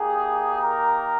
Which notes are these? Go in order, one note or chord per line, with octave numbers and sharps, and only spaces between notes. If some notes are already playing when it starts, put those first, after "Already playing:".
Already playing: A#3 D#4 G4 G#4
A#4